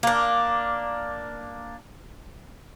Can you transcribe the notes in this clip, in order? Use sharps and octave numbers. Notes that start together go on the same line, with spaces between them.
A#3 D4